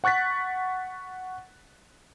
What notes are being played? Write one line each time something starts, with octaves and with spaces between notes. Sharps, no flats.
F#5 C#6 F#6 A6 B6